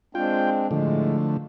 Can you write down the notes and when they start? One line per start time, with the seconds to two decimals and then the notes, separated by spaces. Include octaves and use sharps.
0.15 G#3 C4 D4 F4 G5
0.71 A2 D3 F3 G#3 A3